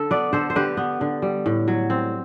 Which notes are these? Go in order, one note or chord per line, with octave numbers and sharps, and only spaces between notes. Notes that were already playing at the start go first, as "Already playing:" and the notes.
Already playing: D3 A4
B3 B4 D5
D3 A4 C5
C5
D3 G4 B4
B3
D3
G3
A2
F#3
C4